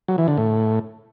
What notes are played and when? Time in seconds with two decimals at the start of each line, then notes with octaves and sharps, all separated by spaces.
0.08 F#3
0.18 E3
0.28 D3
0.37 A2